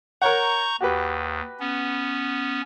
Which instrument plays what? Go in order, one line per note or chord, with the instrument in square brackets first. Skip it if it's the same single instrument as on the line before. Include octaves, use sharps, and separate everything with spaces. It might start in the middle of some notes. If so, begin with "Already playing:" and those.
[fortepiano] A#4 C#5 F#5 [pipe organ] A#5 C#6 G6
[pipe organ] D#2 [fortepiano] F#4 G4 B4
[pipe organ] B3 C#4